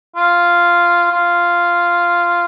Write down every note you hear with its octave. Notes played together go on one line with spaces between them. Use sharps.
F4
F4